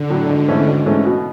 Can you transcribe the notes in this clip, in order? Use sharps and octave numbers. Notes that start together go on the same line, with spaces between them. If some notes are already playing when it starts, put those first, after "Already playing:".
Already playing: D3
A2 F#3
G#1
G#2 E3 A3 C#4
G#1
G#2 E3 A3 C#4
B2